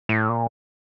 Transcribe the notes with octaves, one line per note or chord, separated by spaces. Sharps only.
A2
A#2